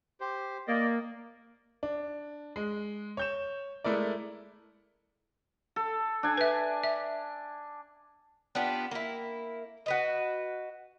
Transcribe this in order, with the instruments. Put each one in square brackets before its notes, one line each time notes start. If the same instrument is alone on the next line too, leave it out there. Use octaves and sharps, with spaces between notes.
[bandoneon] G4 C5
[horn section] A#3 [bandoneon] D5 D#5
[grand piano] D4
G#3
C#5 G6 E7
G#3 A3 E4 A#4 D5
[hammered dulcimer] A4
D4 G#5
[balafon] B4 E5
E5
[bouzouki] B3 D4 F4 G4
A#3 E4
F#4 B4 D#5